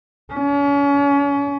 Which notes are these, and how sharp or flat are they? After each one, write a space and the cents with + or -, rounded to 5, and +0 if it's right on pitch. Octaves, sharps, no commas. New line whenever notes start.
C#4 +35